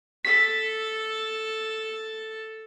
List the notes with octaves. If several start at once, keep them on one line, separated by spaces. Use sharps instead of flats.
A4 B6